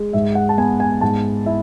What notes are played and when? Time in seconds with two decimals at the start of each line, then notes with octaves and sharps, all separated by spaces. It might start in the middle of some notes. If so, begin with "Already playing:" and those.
Already playing: G#3
0.13 G#2 E5
0.35 F#5
0.49 A5
0.58 B3 G#5
0.80 G#5
1.01 G#2 A5
1.46 E4 E5